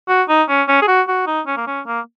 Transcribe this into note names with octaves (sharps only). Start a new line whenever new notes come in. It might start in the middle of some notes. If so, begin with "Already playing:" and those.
F#4
D#4
C#4
C#4
G#4
F#4
F#4
D#4
C#4
A#3
C#4
A#3